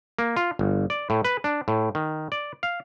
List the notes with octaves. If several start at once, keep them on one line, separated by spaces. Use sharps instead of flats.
A#3
F4
G1
D5
A2
B4
D4
A2
D#3
D5
F5